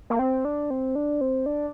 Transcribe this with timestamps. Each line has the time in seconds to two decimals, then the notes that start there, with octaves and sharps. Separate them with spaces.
0.10 A#3
0.19 C4
0.45 D4
0.70 C4
0.95 D4
1.21 C4
1.46 D4